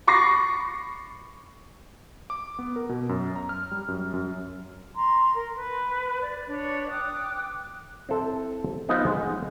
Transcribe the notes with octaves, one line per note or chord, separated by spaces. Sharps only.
B5 C#6 D6 A6 A#6 C7
D6
B3
A#4
B2
F#2
A#5
F6
G3
F#2
F#2
A#5 C6
A#4
B4
D5
D4 B4 C#5 D5
G5 D6 D#6 F#6
C4 E4 A4
B3 D#4 F4 B4 C5 F#5
G#3 F#5